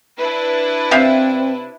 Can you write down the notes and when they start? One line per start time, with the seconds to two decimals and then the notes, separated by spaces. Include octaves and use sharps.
0.18 D4 E4 B4
0.91 C3 C4 E5 F5